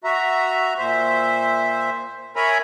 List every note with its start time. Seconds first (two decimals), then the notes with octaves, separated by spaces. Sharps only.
0.04 F#4 E5 A#5
0.78 A#2 C5 E5
2.36 A#4 C#5 E5 G#5 A#5 B5